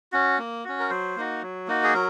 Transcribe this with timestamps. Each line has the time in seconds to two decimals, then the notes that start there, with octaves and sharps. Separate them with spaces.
0.12 C#4 F#4
0.38 A#3
0.65 C#4 F#4
0.80 A#4
0.90 F#3 C5
1.16 A#3 D#4 F#4
1.42 F#3
1.68 A#3 D#4 F#4
1.84 G#4
1.94 F#3 A#4